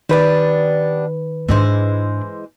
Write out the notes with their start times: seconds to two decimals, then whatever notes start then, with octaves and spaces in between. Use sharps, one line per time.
0.09 D#3 G3 B3 D4 B4
1.49 G#2 E3 G#3 D4 C5